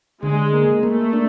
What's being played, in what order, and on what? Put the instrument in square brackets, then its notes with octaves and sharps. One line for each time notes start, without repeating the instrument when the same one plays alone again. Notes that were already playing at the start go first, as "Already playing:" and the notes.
[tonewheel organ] D3 [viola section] G#3
[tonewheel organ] A#3
[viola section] A3 [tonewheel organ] A#3
[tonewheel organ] D4